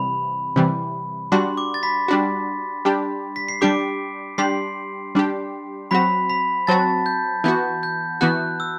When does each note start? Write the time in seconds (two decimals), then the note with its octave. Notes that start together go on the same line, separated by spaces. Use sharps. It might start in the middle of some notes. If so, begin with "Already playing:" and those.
Already playing: C3 E3 G3 B5
0.56 C3 E3 G3
1.32 G3 D4 F#4 C6
1.57 D6
1.74 A6
1.83 B5 B6
2.08 G3 D4 F#4
2.85 G3 D4 G4
3.36 B6
3.49 C7
3.61 G3 D4 G4 D6 D7
4.38 G3 D4 G4 C6 C7
5.15 G3 D4 G4
5.91 F#3 C4 F#4 B5 B6
6.30 B5 B6
6.67 F#3 C4 F#4 A5 A6
7.06 G6
7.44 E3 B3 F#4 G6
7.83 G6
8.21 E3 B3 F#4 F#6
8.60 E6